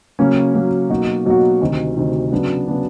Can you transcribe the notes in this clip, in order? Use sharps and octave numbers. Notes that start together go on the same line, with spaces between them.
C#3 F#3 A#3 C#4
C#3 F#3 A#3 C#4
B2 F#3 A#3 D#4 F#4
B2 F#3 A#3 D#4 F#4
D2 C3 D#3
D2 C3 D#3
C#3 F#3 B3 D4
C#3 F#3 B3 D4